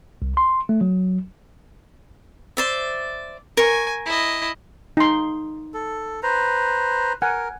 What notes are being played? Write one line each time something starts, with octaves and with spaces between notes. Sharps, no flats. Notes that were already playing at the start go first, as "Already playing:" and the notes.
C2
C6
A3
F#3
C5 D5 E5
A#4 G#5 C#6
E4 D#5
D#4 C6
A4
B4 C5 A#5
A#4 F#5 G#5